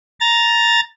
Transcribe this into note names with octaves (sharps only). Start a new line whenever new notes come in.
A#5 A6